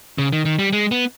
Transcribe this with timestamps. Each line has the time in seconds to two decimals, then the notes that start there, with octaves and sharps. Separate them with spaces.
0.18 C#3
0.33 D#3
0.45 D#3
0.59 G3
0.73 G#3
0.91 B3